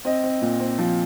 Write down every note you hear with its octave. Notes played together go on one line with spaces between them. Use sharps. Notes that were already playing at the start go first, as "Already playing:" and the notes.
C4 D#5
C4
A#2
C4
F3